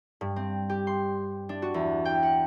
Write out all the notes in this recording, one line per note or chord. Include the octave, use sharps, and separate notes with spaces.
G2
C4
G4
C6
D4
F#4
E2
G5
F#5